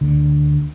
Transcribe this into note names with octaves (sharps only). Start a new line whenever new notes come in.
D2 D3